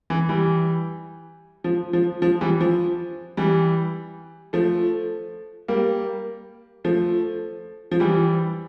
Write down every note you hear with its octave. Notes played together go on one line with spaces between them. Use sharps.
E3
E3 G3
F3
F3
F3
E3 G3
F3
E3 G3
F3 A3
G3 A#3
F3 A3
F3
E3 G3